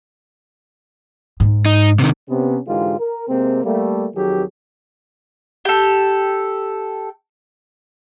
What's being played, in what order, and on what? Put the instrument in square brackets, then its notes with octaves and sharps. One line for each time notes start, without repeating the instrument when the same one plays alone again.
[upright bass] G#2
[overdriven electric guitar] D#4
C3 D#3
[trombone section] C3 B3 C#4
G#2 D3 E3 G#3 F4 G4
A#4
C3 G#3 A#3 C4
G3 A3 A#3
F2 D#3 F#3 G4 G#4
[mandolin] G4 A4